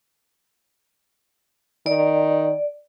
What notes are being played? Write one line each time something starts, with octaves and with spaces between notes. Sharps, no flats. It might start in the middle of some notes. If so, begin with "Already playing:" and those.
D#3 D5